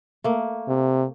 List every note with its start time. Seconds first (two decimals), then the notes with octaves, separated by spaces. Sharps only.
0.24 A3 A#3
0.68 C3